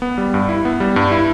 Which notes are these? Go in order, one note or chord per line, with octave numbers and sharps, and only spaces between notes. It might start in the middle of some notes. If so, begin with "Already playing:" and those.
B3
G3
G2
E4
B3
G3
G2
E4